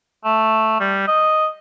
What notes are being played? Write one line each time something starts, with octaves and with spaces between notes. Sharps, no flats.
A3
G3
D#5